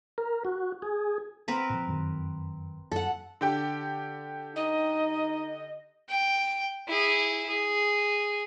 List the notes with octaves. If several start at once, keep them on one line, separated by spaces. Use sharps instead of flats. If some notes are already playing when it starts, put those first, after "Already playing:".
A#4
F#4
G#4
C4 A#4 B4
A#2 F3
F1 F#2 D#3
F#2 A4 F#5
D3 G4 G5
D#4 D#5
G5
E4 G#4
G#4